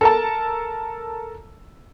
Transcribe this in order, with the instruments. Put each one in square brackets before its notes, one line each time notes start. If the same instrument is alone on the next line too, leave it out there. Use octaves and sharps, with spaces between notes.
[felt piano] A4 A#4 A5